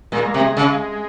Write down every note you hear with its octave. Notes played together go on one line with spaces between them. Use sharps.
A#2 G#3
A#3
C3
G#3
C#3